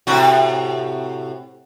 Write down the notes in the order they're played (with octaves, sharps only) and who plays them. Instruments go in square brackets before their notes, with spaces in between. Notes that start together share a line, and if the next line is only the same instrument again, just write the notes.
[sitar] A2 C3 F#4